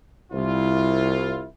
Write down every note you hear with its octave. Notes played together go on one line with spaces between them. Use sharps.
C2 E4 F4